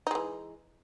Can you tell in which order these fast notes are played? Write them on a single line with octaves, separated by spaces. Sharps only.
D#4 G#3 E3